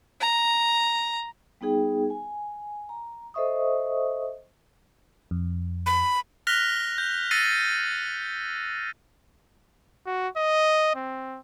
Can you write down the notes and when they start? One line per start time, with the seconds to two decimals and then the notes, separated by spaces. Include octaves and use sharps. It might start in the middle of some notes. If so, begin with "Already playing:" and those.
0.21 A#5
1.61 G3 B3 D#4 G#4 G5
2.10 G#5
2.89 A#5
3.34 A4 C5 D#5 E5 C#6 D#6
5.31 F2
5.86 B5
6.47 F6 F#6 A#6 B6 F7 G7
6.98 G6
7.31 E6 A6 A#6 C7 C#7 D#7
10.06 F#4
10.36 D#5
10.95 C4